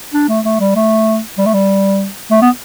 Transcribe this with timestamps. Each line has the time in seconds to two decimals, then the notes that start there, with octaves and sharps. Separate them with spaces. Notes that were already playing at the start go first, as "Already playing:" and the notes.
0.14 D4
0.29 A3
0.45 A3
0.60 G3
0.75 A3
1.38 G3
1.46 A3
1.54 G3
2.31 A3
2.42 B3